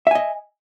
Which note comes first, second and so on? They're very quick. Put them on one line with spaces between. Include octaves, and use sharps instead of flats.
E5 G#5 D#5